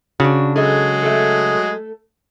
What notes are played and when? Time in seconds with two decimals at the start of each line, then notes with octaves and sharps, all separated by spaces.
0.20 C#3 D4 F#4
0.56 F#3 G#3 G#4 A4 D#5
1.03 A3 A4